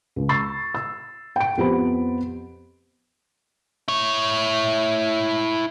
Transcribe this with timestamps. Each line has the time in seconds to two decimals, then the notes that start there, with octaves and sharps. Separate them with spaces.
0.16 C#2
0.29 C#6 E6 A6 C7
0.75 E6
1.36 G5 D7
1.57 F2 B3 G4 C5 B5
3.88 E4 C#5